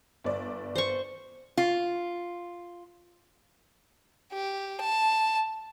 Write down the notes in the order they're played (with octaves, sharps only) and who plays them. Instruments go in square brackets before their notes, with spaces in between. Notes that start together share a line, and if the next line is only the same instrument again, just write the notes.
[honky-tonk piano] G1 D5
[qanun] C5 C#6
[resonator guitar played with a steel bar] F4
[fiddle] G4
A5